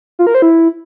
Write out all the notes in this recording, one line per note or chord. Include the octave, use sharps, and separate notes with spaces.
F4
A#4
C5
E4